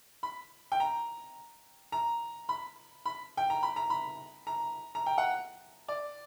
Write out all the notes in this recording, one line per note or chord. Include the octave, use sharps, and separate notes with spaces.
B5
G5
A#5
A#5
B5
B5
G5
A#5
B5
A#5
B5
A#5
A#5
G5
F#5
D5